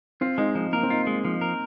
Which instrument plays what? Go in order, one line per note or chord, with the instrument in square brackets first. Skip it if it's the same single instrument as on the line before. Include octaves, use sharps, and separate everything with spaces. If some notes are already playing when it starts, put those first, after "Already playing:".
[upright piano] C4 [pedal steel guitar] F4
[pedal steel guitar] G#3 [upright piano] D#4
[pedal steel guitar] F3 [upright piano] D#4
[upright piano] A#3 [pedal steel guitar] A#4
[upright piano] C4
[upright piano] D#4 [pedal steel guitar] F4
[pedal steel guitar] G#3
[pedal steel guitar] F3 [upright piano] D#4
[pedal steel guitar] A#4